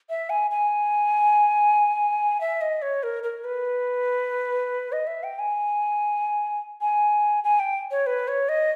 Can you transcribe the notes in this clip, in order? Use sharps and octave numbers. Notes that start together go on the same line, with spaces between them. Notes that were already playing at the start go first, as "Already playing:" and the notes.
E5
G#5
G#5
E5
D#5
C#5
A#4
A#4
B4
D#5
E5
G5
G#5
G#5
G#5
G5
C#5
B4
C#5
D#5